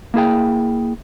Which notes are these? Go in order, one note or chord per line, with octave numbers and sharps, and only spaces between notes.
A#3 E4 G#4 G5